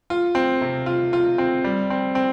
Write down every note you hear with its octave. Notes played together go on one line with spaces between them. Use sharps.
F4
C4
C3
F4
F4
C4
G3
C4
C4